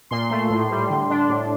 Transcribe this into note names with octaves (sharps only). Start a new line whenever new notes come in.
A#2 C6
A3
A2
G3
D3
D4
A2